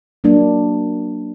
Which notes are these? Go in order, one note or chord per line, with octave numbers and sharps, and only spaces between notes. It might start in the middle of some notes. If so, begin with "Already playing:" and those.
F#3 A#3 D4